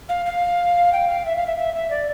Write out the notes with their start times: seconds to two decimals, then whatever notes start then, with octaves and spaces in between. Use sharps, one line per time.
0.09 F5
0.26 F5
0.93 G5
1.08 F5
1.26 E5
1.36 F5
1.47 E5
1.58 E5
1.75 E5
1.91 D5